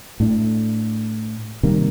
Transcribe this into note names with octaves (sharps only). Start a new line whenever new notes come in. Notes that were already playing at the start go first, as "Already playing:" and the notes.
A2 A3 D4
C3 D#3 G3 A#3